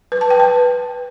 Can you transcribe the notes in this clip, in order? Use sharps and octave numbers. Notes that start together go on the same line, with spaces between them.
B4
A5
G5
B4